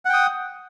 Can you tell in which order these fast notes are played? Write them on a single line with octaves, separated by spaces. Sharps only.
F#5 G5 D#6